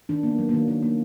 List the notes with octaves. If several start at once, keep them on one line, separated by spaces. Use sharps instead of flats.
D#3 D4
A#3 B3
F#3
D#3 A#3
D#3 A#3
A#3